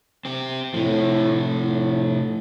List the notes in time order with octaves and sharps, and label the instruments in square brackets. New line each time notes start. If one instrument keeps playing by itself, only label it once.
[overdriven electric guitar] C4 G4
[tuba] A2 [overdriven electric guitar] C3 F3
[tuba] A2